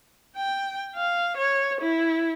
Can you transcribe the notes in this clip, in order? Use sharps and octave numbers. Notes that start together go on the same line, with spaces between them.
G5
F5
C#5
E4